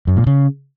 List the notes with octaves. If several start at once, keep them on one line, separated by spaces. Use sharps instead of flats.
F#2
A#2
C#3